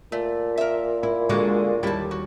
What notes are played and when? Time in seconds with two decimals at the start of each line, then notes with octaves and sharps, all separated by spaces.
0.12 A#2 A3
0.58 A#4 E5
1.03 E4
1.29 D3 G#3 A#3 F#4 D5
1.83 D#2 G3 E4 A5
2.11 F#4